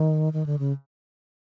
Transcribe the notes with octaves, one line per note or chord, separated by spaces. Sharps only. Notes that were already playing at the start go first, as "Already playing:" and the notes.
Already playing: D#3
D#3
D3
C#3